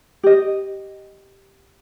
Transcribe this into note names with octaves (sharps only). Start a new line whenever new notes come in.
G4 D#5